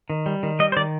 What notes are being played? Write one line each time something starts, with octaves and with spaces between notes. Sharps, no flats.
D#3
G3
D#3
G3 D#5
C5
D#3 D5